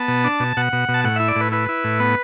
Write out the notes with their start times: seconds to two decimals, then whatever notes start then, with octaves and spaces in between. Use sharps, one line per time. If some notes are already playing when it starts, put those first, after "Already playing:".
Already playing: B3 A5
0.08 B2
0.24 D4
0.40 B2
0.57 B2 F#5
0.73 B2
0.89 B2
0.94 A5
1.04 A2 F#5
1.16 E4 E5
1.28 D5
1.36 A2 B4
1.52 E4 B4
1.69 E4
1.84 A2
2.00 B3